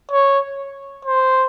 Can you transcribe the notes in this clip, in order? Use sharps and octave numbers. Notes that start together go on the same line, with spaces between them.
C#5
C5